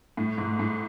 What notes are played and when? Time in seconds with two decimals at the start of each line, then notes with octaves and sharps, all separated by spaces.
0.17 A2
0.38 G#2
0.59 A2